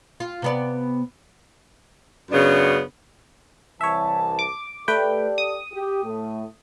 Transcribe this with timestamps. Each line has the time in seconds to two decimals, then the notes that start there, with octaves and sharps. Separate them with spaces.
0.20 F4
0.42 C3 B3 D5
2.31 F#2 C#3 B3 D4
3.81 C2 E3 C#5 E5 A5
4.39 D6
4.88 A3 G4 A4 B4 D5 G5
5.38 D#6
5.72 G4
6.04 A2 A3